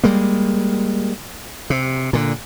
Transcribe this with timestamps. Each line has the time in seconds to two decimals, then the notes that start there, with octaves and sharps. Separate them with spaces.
0.04 G3 G#3 A#3
1.70 C3
2.13 A#2 D3